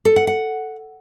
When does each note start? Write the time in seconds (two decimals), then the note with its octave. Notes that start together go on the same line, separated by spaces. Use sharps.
0.05 A4
0.16 F#5
0.27 F#5